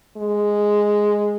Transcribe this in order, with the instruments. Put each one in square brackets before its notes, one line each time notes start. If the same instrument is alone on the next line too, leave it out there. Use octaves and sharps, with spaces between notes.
[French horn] G#3